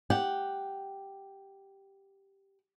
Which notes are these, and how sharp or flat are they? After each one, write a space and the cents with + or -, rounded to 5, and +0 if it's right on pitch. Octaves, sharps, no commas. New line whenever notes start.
G4 +0 F#5 +0